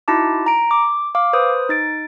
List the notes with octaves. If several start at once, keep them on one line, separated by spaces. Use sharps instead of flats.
D#4 E4 F#4 A5 D6
A#5 D7
D6
F5 D6
B4 C5 D#6
D#4 A6 D7